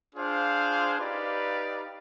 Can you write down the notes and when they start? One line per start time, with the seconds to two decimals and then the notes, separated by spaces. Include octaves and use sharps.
0.14 D4 F4 G#4 C5 F5
0.99 D#4 G4 B4 D5 F5